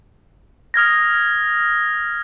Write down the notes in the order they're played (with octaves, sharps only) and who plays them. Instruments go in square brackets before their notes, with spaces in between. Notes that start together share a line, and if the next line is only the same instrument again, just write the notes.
[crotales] D#6 F6 G#6 A#6